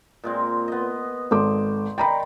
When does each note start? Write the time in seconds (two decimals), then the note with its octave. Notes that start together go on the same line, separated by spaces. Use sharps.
0.24 A#2 G#3 C4
0.68 B3 D#5
1.31 G#1 A4 C5 D6
1.98 D#3 D5 G5 A#5 B5